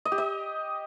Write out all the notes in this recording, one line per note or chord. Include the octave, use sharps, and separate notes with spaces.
D#5
G4
D#5